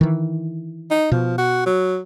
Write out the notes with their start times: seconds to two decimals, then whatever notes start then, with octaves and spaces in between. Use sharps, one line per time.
0.01 D#3 E3
0.90 D#4
1.11 B2 F3
1.38 F#4
1.66 F#3